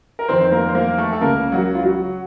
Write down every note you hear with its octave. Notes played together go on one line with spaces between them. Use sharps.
A#4
F2 D#3 C4 C5
C5
A#3 A#4
C5
A#3 A#4
A3 A4
A4
C#2 C#3 A#3 A#4
F#3 F#4
F4
F#3 F#4